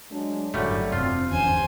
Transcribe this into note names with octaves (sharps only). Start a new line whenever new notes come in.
F#3 G#3 D4
G1 F#2 A2 D3 F#3 G3 A3
F1 C4 F4
G1 E2 G2 C#4 C5 G#5